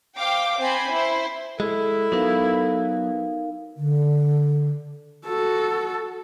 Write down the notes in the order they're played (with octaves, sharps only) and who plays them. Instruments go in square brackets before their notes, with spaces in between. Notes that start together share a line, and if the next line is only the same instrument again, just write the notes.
[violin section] C5 F5 G5 D6
C4 C5 G#5 B5
E4 C5
[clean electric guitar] G#3 [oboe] E4 [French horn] A4
[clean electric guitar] F#3 B3 [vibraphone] D#4 A#4 F5
[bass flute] D3
[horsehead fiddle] F#4 A4